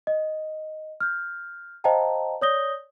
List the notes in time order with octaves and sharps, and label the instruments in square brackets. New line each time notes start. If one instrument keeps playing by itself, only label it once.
[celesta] D#5
F6 G6
C5 D#5 F5 G5 A5 A#5
C#5 D5 D#6 G6 A#6 G7